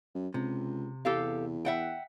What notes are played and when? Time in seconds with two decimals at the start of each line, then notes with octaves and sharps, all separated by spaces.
0.15 F#2
0.34 C#2 C3
1.05 E2 G4 A4 F5
1.65 E5 F#5 G5